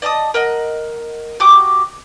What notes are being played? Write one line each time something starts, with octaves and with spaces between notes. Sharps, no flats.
D5 D#5 A5 D#6
A#4 D#5 F#5
F#4 G4 D6 D#6